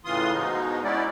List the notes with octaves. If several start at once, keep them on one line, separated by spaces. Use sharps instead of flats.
A2 C#3 E3 F4 C6 D#6
G#2 B2 G#3 D#4
B3 C#4 D#4 E4 D5